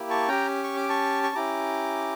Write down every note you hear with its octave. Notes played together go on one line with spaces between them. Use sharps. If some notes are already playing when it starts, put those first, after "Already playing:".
Already playing: A#3 E4 G4
A5 C#6
C#4 G4 G5 A#5
C#6
D6
A5 C#6
C#6
C#4 E4 G4 A#5 D6